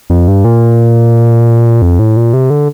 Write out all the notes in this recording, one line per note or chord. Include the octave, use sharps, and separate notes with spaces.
F2
G2
A#2
F2
A2
A#2
C3
D3